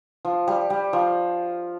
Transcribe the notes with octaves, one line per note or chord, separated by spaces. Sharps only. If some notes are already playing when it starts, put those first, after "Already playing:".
F3
G3
G3
F3